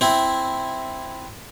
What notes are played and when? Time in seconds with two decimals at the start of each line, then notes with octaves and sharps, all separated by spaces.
0.01 C4 E4